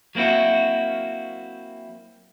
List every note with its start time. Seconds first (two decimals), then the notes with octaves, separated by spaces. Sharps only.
0.15 F#3 A#3 C4 E4 F#4